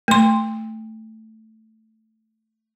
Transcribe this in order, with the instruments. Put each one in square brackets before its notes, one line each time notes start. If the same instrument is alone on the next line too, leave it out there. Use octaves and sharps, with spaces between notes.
[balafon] A3 C6